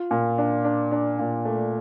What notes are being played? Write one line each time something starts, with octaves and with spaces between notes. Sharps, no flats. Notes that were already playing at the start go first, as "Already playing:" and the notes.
Already playing: F4
A#2
D4
D4
D4
A#2
A3